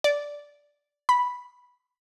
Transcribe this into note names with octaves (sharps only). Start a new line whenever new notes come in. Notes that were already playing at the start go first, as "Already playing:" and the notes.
D5
B5